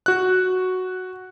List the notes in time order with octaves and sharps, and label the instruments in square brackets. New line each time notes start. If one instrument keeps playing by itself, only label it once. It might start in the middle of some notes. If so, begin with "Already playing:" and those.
[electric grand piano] F#4 F#6